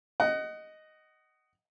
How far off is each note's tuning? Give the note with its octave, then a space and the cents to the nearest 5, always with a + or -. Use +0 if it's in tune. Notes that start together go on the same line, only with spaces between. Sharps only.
D#5 +0 F#5 +25